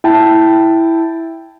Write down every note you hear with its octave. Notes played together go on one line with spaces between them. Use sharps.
E4 G5 A5